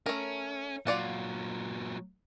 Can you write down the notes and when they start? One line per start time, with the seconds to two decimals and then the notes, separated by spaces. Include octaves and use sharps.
0.06 A3 C#4 A#4
0.87 A#2 F#3 F4 D5 F#5